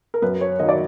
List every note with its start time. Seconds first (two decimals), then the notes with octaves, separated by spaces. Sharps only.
0.14 A#4
0.22 F#2 B4
0.41 C#5
0.60 D#3 F#3 D#5
0.69 D5